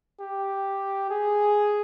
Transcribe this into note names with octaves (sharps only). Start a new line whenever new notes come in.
G4
G#4